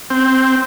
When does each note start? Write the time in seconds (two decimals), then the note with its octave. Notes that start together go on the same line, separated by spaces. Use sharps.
0.10 C4